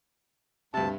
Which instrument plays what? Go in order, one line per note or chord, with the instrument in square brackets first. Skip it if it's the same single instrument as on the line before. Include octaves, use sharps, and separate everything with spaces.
[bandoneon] D2 A5 [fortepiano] G2 C3